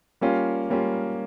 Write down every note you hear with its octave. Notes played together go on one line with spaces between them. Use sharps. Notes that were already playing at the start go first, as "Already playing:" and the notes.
G3 A#3 C#4 F4
G3 A#3 C#4 F4